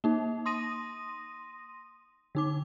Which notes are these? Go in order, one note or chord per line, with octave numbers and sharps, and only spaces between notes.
A#3 D#4
C6 D#6 A#6 D#7
D3 D#4 D6